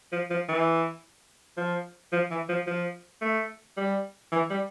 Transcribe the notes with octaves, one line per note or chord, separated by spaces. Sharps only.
F3
F3
E3
F3
F3
E3
F3
F3
A3
G3
E3
G3